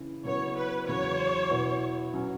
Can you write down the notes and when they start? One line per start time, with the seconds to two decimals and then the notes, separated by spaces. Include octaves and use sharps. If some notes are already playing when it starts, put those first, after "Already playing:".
Already playing: C#3 E3 C#4 E4
0.24 C#3 F#3 B3 E4 C#5
0.56 B4
0.87 E2 C#3 F#3 C#5
1.50 B2 B3 E4
2.14 F#3 C#4